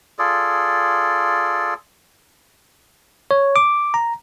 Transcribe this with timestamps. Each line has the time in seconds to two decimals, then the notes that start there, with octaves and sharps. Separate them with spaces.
0.19 F4 G#4 A4 D5
3.31 C#5
3.56 D6
3.94 A#5